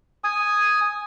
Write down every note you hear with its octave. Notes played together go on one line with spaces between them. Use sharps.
G#5 D#6